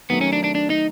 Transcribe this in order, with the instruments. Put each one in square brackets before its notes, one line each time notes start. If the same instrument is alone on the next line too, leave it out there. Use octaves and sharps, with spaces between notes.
[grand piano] D#3 F#3 A3 C4 [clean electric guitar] B3
[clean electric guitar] C#4
D4
D4
D4
D#4